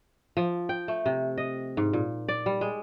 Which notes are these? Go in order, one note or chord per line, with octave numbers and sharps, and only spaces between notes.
F3
G5
A3
C3
D#5
G#2
A#2
D5
G3
G#3